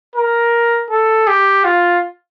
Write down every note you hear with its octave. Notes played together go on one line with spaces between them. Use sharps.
A#4
A4
G4
F4